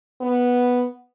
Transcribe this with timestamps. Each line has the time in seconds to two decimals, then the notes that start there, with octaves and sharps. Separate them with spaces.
0.21 B3